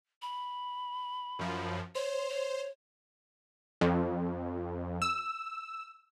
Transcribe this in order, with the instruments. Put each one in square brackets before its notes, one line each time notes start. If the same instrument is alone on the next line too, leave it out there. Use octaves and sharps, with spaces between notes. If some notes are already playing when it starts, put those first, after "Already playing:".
[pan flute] B5
[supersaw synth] F#2 F3
[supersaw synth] C5 [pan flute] C#5
[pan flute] C#5
[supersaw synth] F2
E6